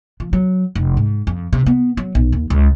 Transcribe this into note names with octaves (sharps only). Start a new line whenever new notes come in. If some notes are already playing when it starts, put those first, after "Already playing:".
F3
F#3
F1
G#2
F2
C3
B3
F#3
B1
D#2
C#2